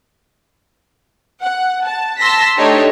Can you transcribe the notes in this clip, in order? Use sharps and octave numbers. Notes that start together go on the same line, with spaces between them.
F#5
A5
A5 C6 E6 A#6 B6
A3 D4 D#4 G4 C#5 D#5